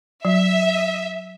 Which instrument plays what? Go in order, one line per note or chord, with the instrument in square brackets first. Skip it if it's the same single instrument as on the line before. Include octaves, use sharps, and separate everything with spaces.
[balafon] F#3 [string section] E5